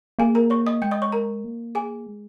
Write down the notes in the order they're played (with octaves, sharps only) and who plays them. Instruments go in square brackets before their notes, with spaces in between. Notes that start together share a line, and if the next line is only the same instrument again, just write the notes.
[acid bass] A#3 [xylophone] G#4 G#5
[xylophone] A#4 A#5
C#5 C#6
D#5 D#6
[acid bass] G#3 [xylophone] G5 G6
[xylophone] D#5 D#6
C#5 C#6
A#4 A#5
[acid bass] A#3
[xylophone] G#4 G#5
[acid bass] G#3